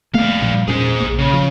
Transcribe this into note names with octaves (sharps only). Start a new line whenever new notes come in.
G3 A3 A#3 F5
G2 A#2 F3
E1 A#2 C#4 G#4 C5
A#1 F#2 A#3
C#3
F3